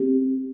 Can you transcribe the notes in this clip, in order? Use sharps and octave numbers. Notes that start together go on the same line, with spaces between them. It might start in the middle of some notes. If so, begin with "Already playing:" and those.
Already playing: C4 G4